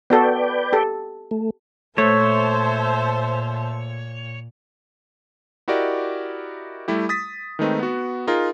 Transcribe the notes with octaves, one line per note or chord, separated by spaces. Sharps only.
B3 F#4 A4 B4 D5 G5
G4 A4
A3
A#2 A3 C5 C#5 E5 A5
E4 F#4 G4 A#4 D5 D#5
G3 A3 E4 G4
D#6 A6 B6
D#3 G#3 A3 C4 D#4 B4
B3 F#4
D#4 F4 G#4 A#4